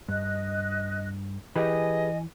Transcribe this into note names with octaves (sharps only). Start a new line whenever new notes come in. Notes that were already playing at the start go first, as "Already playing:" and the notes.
G2 D#5 F#6
E3 G4 G#4 B4 D#5 G#5